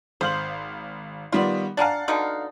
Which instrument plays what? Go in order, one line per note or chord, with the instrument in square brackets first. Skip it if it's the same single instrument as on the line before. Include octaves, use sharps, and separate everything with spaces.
[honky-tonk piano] G#1 F5 F#7 [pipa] C5
[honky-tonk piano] D#3 G3 B3 [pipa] F4 D5
[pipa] D4 G#5 A#5 [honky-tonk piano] F5 F#5 A6
[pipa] B2 D3 D#4